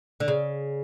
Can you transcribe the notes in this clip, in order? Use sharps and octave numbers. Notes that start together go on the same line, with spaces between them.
D3
C#3